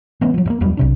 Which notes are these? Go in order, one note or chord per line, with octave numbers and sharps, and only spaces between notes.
E3 A3 B3 C#4
F3 F#3
G2 A#3
D#1 E2 F#3 G3
B1 C3 D4